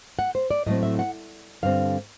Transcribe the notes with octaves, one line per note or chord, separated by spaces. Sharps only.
F#5
C5
D5
A2 F#3 A3 C4 D#5
E5
F#5
G2 D3 G3 C4 F5